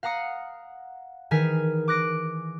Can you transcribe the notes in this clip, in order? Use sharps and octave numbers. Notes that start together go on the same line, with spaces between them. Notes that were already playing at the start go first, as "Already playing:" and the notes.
F5 F#5 A#5 D#6 C#7
D#3 E3 G#4 G#5 F6 B6
D6 F#6 A#6 D7